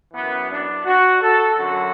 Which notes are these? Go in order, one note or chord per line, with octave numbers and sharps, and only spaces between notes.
F#2 E3 B3
D4
F#4
A4
F#2 D3 F#3 F#4